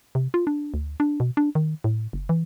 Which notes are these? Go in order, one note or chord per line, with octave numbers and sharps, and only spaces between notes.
C3
F4
D4
D2
D4
B2
D4
D#3
A2
F#1
E3